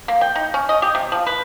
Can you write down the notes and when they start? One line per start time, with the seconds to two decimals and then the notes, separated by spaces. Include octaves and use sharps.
0.08 A#3
0.21 G5
0.35 D#4
0.54 C#4
0.69 D#5
0.82 G4
0.95 C3
1.12 F3
1.27 B4